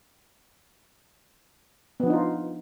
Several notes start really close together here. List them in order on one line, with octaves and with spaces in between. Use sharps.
B3 F3 D4 D#4 F4